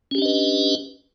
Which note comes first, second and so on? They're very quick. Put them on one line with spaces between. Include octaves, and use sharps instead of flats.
C#4 G4 D4 D#5 B4